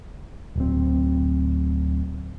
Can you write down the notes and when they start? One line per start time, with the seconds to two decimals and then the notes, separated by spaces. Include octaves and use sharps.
0.55 D1 C4